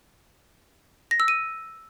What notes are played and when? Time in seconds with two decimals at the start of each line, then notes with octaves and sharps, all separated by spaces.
1.11 A#6
1.20 E6
1.28 D#7